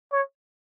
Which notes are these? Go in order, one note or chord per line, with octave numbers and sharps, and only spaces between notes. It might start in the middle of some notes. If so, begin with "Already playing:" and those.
C#5